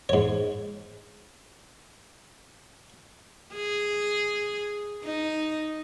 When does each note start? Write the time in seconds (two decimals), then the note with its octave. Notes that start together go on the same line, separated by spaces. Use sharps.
0.09 G#2 C#5
3.54 G#4
5.04 D#4